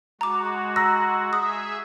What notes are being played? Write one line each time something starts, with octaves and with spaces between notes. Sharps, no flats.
G#3 F#4 A#5 D6
A#5 E6 F#6 A#6
G#4 E5 D#6